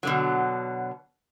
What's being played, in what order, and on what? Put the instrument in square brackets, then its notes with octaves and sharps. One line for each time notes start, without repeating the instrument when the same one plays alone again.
[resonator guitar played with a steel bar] B2 D3 F#3